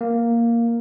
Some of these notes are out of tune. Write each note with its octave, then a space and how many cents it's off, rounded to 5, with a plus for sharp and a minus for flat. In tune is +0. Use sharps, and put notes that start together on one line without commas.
A#3 +0